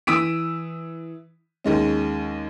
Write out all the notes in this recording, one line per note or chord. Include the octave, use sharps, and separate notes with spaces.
E3 D#6 E6 B6 D7
D#2 G#3 C#4